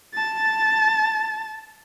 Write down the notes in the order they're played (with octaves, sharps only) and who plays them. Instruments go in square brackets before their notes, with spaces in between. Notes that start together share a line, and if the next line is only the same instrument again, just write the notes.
[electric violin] A5 A6